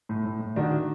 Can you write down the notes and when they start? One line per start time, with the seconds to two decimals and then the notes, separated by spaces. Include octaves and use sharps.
0.09 A2
0.25 A2
0.41 A2
0.56 D#3 D4 F#4